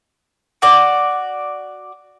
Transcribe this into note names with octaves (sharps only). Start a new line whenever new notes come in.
F#4 D5